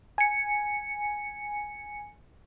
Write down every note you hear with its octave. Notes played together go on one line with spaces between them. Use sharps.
G#5 C#7